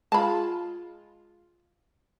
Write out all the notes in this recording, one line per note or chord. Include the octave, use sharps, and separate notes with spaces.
G#3 F4 A5 B5